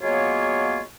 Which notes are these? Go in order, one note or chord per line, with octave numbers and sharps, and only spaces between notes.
F#3 G#3 A#3 B3 F4 C#5